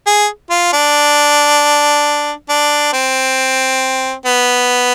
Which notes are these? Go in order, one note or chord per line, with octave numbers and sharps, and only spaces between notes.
G#4
F4
D4
D4
C4
B3